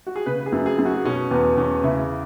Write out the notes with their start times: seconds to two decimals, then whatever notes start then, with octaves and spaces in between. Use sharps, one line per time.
0.07 F#4
0.16 G#4
0.26 C#3 B4
0.39 B4
0.46 G#4
0.52 F#2
0.66 G#4
0.79 F#2
0.85 F#4
1.05 B2 C#4
1.31 E2 B3
1.57 E2 C#4
1.84 C#3 E4